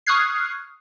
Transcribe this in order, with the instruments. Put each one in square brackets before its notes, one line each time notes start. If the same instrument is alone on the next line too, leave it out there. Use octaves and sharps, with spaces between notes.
[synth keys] C#6 D#6 F6 F#6 G#6 C7